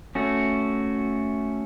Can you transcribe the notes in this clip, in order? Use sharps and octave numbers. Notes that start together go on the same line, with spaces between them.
A3 C#4 F#4